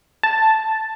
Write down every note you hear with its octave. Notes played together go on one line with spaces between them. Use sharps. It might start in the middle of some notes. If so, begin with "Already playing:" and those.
A5